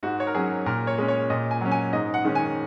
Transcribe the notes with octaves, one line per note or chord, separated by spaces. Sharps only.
G#2 F#4
C#5
A#4
F#3 C#4 G#4
A#2 A#4
C#5
G#3 C#4
C#5
A#2 D#5
G#5
F#3 C#4
G#5
G#2 D#5
F#5
D#3 G#3 C#4
G#5